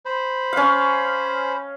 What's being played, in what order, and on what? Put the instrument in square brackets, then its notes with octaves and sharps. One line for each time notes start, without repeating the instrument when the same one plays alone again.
[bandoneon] C5 B5
[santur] C#4 F5